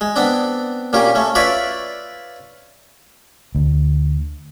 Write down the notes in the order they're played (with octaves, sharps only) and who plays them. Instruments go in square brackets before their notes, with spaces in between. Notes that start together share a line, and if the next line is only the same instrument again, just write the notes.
[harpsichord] G#3
B3 C4 D4
A#2 A#3 C#4 G4
A3 C#4
F4 B4 C#5 D5 E5
[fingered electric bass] D2